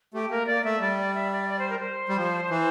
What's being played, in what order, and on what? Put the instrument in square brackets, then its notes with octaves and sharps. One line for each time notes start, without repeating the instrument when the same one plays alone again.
[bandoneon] A3 [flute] G4
[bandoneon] A#3 [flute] A#4
[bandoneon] A#3 [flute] D5
[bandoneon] A3 [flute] E5
[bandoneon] G3 [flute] D5
[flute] D5
E5
D5
D5
C5
A#4
C5
[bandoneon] G3
F3
E3